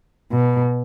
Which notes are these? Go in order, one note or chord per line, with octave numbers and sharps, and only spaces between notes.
B2